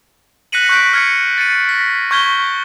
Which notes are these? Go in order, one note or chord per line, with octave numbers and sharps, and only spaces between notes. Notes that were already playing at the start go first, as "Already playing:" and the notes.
F#6 A#6 B6 C#7 D#7 F#7
C#6 F#6 G6 B6 D7
F6 G#6 C#7
A6 C#7 D#7
A#6 B6
C#6 F6 G6 G#6 B6 G7